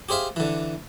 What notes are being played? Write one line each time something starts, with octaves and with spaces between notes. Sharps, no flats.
G4 G#4 C5 E5 F5
D3 E3